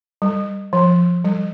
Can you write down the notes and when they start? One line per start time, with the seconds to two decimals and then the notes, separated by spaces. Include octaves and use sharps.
0.22 G3
0.73 F3
1.25 G3